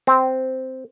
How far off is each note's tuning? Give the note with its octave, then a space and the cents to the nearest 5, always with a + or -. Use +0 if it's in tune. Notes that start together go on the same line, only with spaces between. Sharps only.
C4 -5